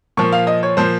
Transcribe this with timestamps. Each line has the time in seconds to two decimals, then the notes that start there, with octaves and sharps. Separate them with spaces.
0.17 A#2 F3 C#6
0.32 F5
0.47 D#5
0.63 C#5
0.77 A#2 F3 C5